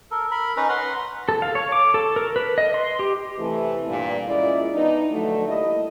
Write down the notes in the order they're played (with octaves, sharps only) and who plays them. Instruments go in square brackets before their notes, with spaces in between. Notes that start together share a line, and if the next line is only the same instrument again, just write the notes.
[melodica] A4 A#4
A#4 B5
C#4 D#4 B4 A#5
B4 F#5 A#5 C6
[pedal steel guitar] A4
F5
C#5
D6
A4
A#4
B4
D#5
C6
G4
[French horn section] C3 E3 A3
G2 A#2
G#3 A#3 C#4 E4 F4 D5
E3 B3 D4 D#4
D3 F3 F#3 A3
G3 A#3 E4 D#5